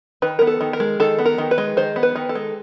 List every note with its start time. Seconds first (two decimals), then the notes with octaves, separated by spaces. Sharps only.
0.22 D#3 B4
0.39 B3 A#4
0.47 A4
0.61 D#3
0.73 A#4
0.80 G#3
1.00 D#3 A4
1.18 B3
1.26 A#4
1.38 D#3
1.51 B4
1.58 G#3
1.77 D#3 C5
1.96 B3
2.03 B4
2.15 D#3
2.29 A4
2.35 G#3